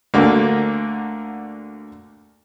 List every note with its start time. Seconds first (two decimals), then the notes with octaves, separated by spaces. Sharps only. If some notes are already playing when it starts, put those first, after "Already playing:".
0.14 D2 D3 A#3